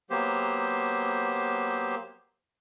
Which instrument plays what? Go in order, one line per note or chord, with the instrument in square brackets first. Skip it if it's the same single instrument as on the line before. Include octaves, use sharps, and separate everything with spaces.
[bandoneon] F#3 A#3 B3 G4 C5